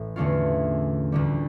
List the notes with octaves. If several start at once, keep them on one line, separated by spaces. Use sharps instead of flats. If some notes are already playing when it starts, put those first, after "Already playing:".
Already playing: A1 A2
E2 D3 A3 C#4 F4
D2 D3 G3